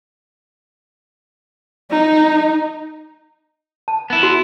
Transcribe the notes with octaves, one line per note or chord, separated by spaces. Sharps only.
D#4
A5
B3 E4
F#4